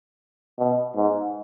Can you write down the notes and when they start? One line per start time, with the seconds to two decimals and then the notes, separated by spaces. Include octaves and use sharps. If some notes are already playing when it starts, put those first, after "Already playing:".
0.59 B2
0.96 G#2